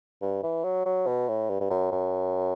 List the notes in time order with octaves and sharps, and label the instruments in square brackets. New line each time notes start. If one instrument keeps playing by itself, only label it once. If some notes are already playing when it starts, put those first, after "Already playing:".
[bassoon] G2
E3
F#3
F#3
B2
A2
G2
G2
F#2
F#2